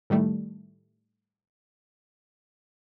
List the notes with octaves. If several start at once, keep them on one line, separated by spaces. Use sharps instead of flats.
A2 D#3 G3 A3